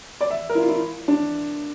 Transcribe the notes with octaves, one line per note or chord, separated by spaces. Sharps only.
D5
E5
A#4
E4
F4
E4
D4